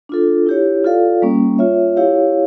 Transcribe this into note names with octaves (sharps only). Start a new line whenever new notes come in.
D4 F4 A4
E4 G4 C#5
F4 A4 D5 F5
G3 A#3 C#4
F4 C#5 E5
E4 G4 C#5 F5